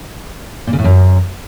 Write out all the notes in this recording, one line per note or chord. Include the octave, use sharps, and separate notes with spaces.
A#2
C#3
A2
F#2